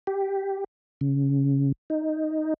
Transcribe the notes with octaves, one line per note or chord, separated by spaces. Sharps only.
G4
C#3
D#4